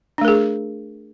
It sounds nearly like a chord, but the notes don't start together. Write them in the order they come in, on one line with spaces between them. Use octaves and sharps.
D4 A3 A#4 G#4